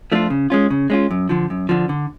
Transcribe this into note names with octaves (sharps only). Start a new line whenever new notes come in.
F3 A3 D4 F4
C#3
G#3 C#4 F4
C#3
G#3 C#4 F4
F#2
D3 F3
F#2
D3 F3
D3